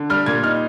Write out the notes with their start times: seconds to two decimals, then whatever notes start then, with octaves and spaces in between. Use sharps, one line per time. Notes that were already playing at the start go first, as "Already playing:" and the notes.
Already playing: D3
0.10 G3 F6
0.26 A#2 G#6
0.44 D#4 F6